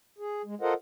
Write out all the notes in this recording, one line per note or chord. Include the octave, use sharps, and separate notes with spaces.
G#4
G#3
F4 A4 A#4 C5 D#5 F#5